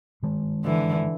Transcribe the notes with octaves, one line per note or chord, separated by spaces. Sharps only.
G2 D#3 G#3
D3 E3